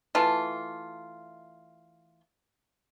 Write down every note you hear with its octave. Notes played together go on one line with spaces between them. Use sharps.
E3 A3 F4